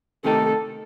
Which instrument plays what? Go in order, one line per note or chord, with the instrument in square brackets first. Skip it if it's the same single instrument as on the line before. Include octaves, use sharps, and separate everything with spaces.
[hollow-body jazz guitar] C3 D#3 A3 D#4 G4 [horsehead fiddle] A4